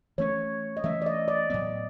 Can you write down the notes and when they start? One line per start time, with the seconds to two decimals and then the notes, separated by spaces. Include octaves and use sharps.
0.18 E3 A3 C#4 C#5
0.77 D#5
0.84 E3 A3 C#4 E5
1.02 D5
1.06 D#5
1.28 D5
1.50 A2 F#3 B3